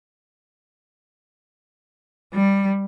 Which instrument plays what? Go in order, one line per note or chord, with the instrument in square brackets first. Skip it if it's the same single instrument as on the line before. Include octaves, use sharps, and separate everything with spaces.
[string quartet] G3